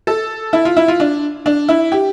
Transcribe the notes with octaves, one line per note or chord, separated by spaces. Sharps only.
A4
E4
F4
E4
F4
D4
D4
E4
G4